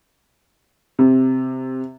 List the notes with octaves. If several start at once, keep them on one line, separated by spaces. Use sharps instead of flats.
C3